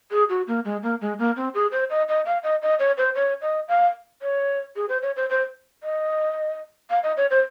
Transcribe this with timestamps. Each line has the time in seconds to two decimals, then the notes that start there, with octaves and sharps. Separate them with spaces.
0.11 G#4
0.29 F#4
0.48 A#3
0.65 G#3
0.83 A#3
1.01 G#3
1.19 A#3
1.36 C4
1.55 G#4
1.72 C5
1.90 D#5
2.09 D#5
2.26 F5
2.44 D#5
2.62 D#5
2.79 C#5
2.98 C5
3.15 C#5
3.42 D#5
3.68 F5
4.22 C#5
4.76 G#4
4.89 C5
5.02 C#5
5.16 C5
5.30 C5
5.83 D#5
6.90 F5
7.03 D#5
7.17 C#5
7.30 C5